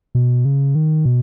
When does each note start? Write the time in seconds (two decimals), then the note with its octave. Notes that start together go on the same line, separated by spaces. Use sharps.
0.15 B2
0.45 C#3
0.75 D#3
1.05 B2